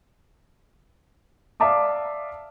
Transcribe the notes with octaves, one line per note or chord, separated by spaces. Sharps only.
D5 E5 F5 A5 D6 D#6